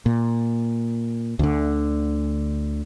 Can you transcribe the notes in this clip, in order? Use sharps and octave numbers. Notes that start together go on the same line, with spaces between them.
A#2
D2 D3